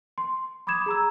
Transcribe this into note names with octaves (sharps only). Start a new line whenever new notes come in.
C6
B5 D6 D#6 G#6 E7
G#4 A#5 E6